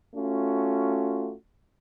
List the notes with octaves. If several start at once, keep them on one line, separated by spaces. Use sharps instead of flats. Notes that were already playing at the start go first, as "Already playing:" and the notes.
A3 C#4 F4 F#4